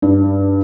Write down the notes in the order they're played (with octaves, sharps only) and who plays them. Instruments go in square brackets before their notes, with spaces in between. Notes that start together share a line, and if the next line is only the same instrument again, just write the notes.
[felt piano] G2